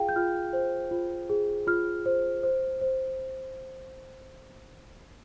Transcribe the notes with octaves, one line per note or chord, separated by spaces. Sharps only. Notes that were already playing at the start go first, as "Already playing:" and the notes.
Already playing: F4 G#4 F5 G5
G6
F4 F6
C5
F4
G#4
F4 F6
C5
C5
C5